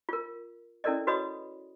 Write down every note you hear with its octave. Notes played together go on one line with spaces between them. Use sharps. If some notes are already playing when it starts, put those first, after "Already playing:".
F4 A#4
C#4 E4 A4 A#4 D5 D#5
F#4 B4 C#5 D#5 B5 D#6